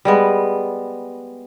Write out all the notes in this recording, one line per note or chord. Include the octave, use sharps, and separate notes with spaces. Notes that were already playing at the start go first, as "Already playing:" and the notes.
G3 G#3 B3